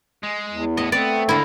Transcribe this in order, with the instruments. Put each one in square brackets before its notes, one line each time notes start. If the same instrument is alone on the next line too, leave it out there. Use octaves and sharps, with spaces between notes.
[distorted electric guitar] G#3
[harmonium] E2
[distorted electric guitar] A2 [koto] D#5
[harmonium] A3 C4 [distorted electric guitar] B3 [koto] D5
[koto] D3 E4 [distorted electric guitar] A#3 D#4